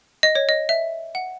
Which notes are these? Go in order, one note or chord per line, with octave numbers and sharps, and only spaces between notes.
D#5
C#5
D#5
E5
F#5